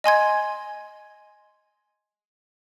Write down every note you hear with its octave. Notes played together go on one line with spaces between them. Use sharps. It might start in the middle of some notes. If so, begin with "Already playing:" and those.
D#5 G#5 C6 G#6